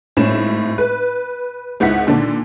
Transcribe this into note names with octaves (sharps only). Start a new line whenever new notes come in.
G#1 A2 C#4 E7
B4
G#1 C#2 E4 F#5 B6
A#2 D3 D#3 D4